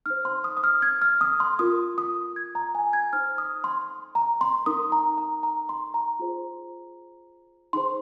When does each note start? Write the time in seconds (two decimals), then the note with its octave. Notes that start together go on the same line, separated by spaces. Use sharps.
0.06 D#4 C5 F6
0.25 C6
0.44 D#6
0.57 D#6
0.64 F6
0.82 G#6
1.02 F6
1.21 D#6
1.40 C6
1.59 F4 A#4 D#6
1.98 D#6
2.36 G#6
2.55 A#5
2.75 G#5
2.93 G#6
3.13 D#4 C5 F6
3.38 D#6
3.64 C6
4.15 A#5
4.41 C6
4.66 D#4 A#4 D#6
4.92 A#5
5.18 A#5
5.43 A#5
5.69 C6
5.94 A#5
6.19 F4 G#4 C5
7.73 D#4 G#4 C5 C6